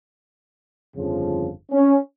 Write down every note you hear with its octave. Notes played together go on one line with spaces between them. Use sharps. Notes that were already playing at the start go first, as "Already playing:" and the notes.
G1 F2 C#3 F3
C#4